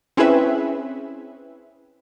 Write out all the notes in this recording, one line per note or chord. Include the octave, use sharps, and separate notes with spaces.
C4 C#4 E4 G#4 B4 E5